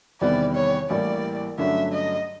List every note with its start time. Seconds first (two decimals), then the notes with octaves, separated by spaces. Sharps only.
0.21 E2 C3 D#3 G3 B3 D5
0.55 C#5
0.90 A1 A2 E3 G3 A#3 D5
1.58 G2 D3 F#3 A3 C#4 E5
1.93 D#5